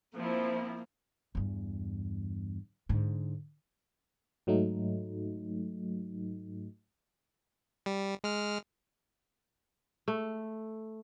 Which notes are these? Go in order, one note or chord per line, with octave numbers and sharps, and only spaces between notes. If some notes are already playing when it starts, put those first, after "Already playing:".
F3 A#3 C4 E4
E2 G2
G#2 D3
G#2 F#3 A3 D#4
G3
G#3 F6
A3